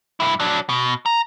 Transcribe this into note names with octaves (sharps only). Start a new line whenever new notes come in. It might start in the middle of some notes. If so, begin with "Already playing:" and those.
G2 E4
F#3 D4
B2
A#5